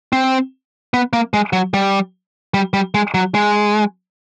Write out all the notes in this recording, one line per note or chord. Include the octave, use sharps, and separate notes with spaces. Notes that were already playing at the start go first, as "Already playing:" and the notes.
C4
B3
A#3
G#3
F#3
G3
G3
G3
G#3
F#3
G#3